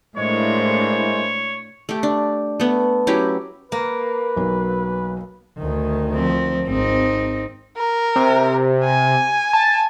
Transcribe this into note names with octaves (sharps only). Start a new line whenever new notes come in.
A2 G#3 A#3 D4 E4 C5 C#5
A3 G4
D4
A3 B3
F#3 C#4 E4 G4
A#3 B4
B1 F#3
D2 D#3
F3 C4
G#1 C4 D#4
A#4
C3
G#5
A5